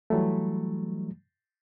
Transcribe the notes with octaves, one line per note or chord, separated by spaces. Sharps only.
E3 F#3 G3 A3